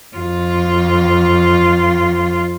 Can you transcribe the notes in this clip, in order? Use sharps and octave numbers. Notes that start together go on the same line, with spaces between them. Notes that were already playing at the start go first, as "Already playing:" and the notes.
F2 F4